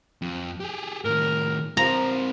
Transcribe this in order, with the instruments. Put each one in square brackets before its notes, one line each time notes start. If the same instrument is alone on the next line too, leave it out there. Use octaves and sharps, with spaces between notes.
[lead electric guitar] F2
G4 G#4
[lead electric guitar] A2 D#3 [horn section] A#4
[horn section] F3 [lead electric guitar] C4 A#4 [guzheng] A#5